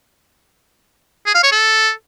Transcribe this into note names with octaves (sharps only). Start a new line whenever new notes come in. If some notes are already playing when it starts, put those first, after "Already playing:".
G#4
F5
C#5
A4